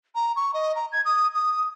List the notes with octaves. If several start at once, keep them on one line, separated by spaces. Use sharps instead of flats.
A#5
C#6
D#5
A#5
G#6
D#6
D#6